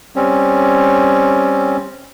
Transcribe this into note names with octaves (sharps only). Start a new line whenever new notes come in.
G3 C4 C#4